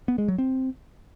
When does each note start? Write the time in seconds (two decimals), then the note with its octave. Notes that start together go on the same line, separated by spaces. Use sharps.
0.08 B3
0.18 G#3
0.28 F#3
0.38 C4